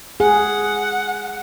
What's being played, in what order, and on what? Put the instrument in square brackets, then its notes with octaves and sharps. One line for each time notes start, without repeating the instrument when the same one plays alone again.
[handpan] G#4 [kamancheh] F#5